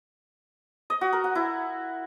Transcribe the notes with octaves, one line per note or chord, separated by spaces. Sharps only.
D#5
F#4
A#4
F#5
E4